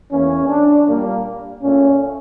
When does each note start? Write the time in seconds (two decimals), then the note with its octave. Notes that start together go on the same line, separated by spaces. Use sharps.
0.11 E2 E3 A#3 C#4
0.48 D4
0.86 A#2 G3 A#3
1.62 A#2 A3 C#4